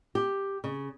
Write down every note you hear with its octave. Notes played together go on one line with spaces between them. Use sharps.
G4
C#3